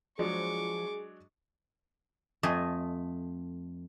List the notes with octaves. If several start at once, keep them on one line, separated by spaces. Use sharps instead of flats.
F3 F#3 G#3 D4 G#4 C#6 D6
F2 A3 D#5 G#5